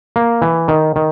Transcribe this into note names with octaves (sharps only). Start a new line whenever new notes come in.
A#3
E3
D#3
D#3